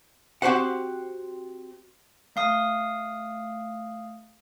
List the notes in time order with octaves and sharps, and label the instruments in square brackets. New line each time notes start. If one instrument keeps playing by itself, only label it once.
[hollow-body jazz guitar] C4 F#4 G4 C5 F#5
[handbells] A3 F5 D#6